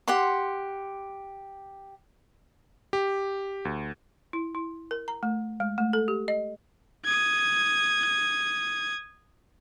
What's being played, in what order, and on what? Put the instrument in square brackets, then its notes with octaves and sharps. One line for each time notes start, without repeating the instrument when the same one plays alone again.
[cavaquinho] G4 F#5 C6
[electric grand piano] G4
D2
[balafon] E4
E4
A#4
A#5
A3
G#3
A3
A4
G4
D#5
[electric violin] D#6 G#6